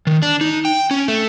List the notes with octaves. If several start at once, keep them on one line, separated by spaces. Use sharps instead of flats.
D#3
D4
D#4
G5
C#4
A3